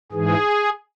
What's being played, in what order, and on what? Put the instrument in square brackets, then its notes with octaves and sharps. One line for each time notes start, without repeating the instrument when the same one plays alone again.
[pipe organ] G#2 E3 G#4